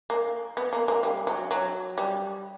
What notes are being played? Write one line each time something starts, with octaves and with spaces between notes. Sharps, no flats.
A#3
B3
A#3
A#3
G3
F#3
F#3
G3